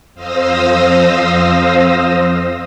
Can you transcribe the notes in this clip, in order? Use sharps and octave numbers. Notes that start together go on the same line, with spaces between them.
F2 C5 F5 D#6 E6 A#6